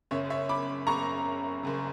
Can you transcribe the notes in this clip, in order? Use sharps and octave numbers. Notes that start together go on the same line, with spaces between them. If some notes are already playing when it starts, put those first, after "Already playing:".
F#1 F#2 C#3 C#5 E5
C#5 E5
B5 D6
F#1 F#2 C#3 A#5 C#6
F#1 F#2 C#3